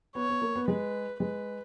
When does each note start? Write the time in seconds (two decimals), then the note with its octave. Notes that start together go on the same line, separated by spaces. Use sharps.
0.15 B3 C#5
0.29 B3
0.42 A#3
0.55 B3
0.68 G#3 B4
1.20 G#3 B4